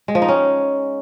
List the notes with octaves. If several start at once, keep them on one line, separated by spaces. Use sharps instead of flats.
G#3
F3
D#4
C#4